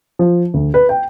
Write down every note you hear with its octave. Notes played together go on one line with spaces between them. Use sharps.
F3
D2
B4
G5